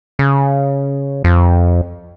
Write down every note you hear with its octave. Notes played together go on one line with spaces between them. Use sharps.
C#3
F2